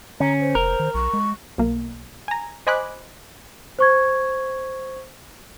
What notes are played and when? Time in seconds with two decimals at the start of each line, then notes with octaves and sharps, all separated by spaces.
0.20 D3 C#4 A#5
0.41 C5
0.55 F1 A#4
0.80 D#3
0.94 B1 C#6
1.13 G#3
1.58 B1 A#3
2.28 G#5 A#5
2.67 C5 D#5 G#5 B5 D6 F#6
3.79 C5 C#6 G#6